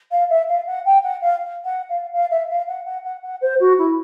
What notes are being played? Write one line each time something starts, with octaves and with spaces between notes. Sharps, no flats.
F5
E5
F5
F#5
G5
F#5
F5
F#5
F5
F5
E5
F5
F#5
F#5
F#5
F#5
C5
F#4
E4